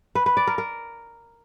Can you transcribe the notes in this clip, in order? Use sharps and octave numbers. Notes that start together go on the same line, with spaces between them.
B4
B4
D5
A#4
A#4